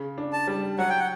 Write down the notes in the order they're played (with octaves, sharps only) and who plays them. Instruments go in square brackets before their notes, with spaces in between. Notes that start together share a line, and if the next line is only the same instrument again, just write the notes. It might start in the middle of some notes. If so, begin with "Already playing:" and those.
Already playing: [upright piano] C#3
D4
[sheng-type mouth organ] A5
[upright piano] G3
[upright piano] F#3 [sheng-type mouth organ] F#5
[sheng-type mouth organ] G5
F#5